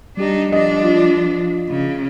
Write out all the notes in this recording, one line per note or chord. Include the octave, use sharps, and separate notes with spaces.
G3 D4 D#4 G4
F3 D4 D#5
F4
C#3